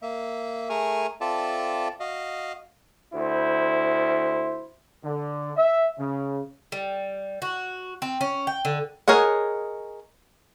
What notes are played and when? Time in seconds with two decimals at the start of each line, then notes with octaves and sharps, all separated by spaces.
0.02 A#3 E5
0.70 A3 G#4 A#4 G#5 C#6 F6
1.21 C4 F4 A4 D5 E5 A5
2.00 F#4 D#5 F5
3.15 D2 E4 C5
5.04 D3
5.57 E5
5.99 C#3
6.72 G3
7.42 F#4
8.02 C4
8.21 C#4
8.47 G5
8.65 D3
9.08 G#4 A#4 C#5 D#5 F#5